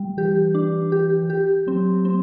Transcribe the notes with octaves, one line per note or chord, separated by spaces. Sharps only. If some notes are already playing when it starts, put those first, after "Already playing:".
Already playing: G3
E3 G4
D4
G4
G4
F#3 C4
C4